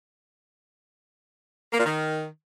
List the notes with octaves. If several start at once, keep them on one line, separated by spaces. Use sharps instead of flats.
A#3
A#2
D#3